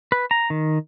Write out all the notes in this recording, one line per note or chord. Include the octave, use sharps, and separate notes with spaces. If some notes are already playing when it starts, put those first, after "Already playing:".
B4
A#5
D#3